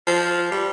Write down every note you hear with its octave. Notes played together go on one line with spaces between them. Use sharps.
F3
G3